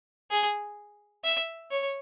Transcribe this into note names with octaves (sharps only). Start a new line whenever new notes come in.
G#4
E5
C#5